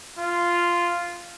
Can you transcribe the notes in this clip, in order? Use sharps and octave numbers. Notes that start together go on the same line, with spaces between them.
F4